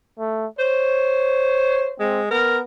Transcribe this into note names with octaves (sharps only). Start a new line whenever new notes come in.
A3
C5 C#5
G#3 C4
B3 A#4